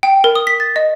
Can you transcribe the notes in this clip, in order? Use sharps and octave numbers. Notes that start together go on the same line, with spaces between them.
G5
A#4
D#6
B6
A6
D#5